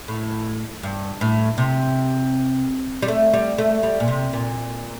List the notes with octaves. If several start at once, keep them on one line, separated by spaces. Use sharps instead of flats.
A2
G2
A2
C3
G3
A3
G3
A3
G3
A#2
C3
A#2